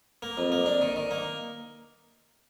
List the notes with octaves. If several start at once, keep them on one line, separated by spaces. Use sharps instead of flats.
A#3
F2
A#3
D4
D#3
D#3
A#3